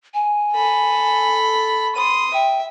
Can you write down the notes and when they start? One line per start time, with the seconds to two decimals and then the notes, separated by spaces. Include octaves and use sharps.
0.14 G#5
0.53 A4 B5
1.96 B5 C6 D#6
2.34 E5 G5